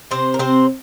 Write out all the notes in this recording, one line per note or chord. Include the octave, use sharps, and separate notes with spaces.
C3 C4 C5
A#4
C3 C4 C5